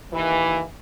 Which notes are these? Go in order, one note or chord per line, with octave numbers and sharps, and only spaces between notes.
D#2 E3